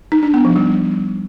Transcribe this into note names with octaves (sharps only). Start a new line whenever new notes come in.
D#4
D4
B3
F3
G3